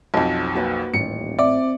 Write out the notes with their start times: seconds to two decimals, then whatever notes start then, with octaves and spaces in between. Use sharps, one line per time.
0.14 B1 F2 C4 F#4 D#5 A5
0.54 A#3 F#4 B4
0.94 D#1 A1 C#7
1.39 C4 D5 E5 D6